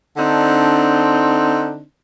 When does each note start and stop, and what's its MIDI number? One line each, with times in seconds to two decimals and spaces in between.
0.17 1.83 50
0.17 1.83 60
0.17 1.83 62
0.17 1.83 63